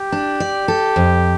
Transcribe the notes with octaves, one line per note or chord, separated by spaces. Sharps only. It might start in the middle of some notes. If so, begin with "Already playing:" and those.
Already playing: G4
D4
D5
A4
F2